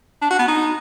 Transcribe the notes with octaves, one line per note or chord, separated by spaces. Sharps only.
D4
F#4
B3
D#4